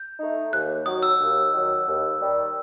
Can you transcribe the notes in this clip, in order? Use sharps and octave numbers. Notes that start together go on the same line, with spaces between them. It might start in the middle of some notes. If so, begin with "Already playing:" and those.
Already playing: G6
A3 D#4
D#2 F#6
D#3 F#3 D#6
E6
D#2
D#3 F#3
D#2
D#3 G3